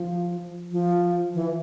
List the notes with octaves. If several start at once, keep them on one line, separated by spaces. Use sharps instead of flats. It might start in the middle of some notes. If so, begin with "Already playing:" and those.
Already playing: F3
F3
E3